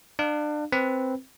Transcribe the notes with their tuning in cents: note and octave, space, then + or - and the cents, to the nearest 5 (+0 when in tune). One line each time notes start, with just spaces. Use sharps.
D4 +30 F5 +0
C4 +0 B4 +0